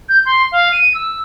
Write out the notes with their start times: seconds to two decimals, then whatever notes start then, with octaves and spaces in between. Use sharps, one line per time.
0.09 G6
0.26 C6
0.52 F5
0.72 D#7
0.94 E6